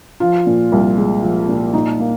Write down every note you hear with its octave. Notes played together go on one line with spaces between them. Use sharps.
F3 F4
A#2
C2
G#3
F3
A#2
A#2 D#4
A#3